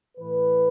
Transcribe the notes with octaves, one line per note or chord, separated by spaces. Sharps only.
A2 E3 B4